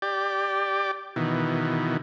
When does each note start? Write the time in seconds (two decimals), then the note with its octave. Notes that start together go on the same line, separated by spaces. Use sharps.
0.02 G4 D5
1.16 B2 D#3 E3